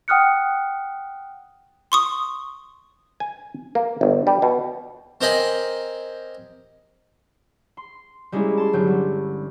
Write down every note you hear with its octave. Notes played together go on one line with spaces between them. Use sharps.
F#5 G5 D#6 F6 F#6 C#7
C6 C#6 D#6
G#5
A#3
G1
G3
B2
C4 G4 A#4 D#5 G#5 B5
C6
G3 G#3 A#3 C#4 E4
A5 C6
G1 F#3 C#6 G6
G3